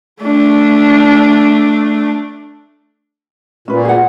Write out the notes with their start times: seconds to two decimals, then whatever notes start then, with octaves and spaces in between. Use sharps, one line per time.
0.22 A3 D4
3.68 A#2 C#4 B4
3.85 G#4 F#5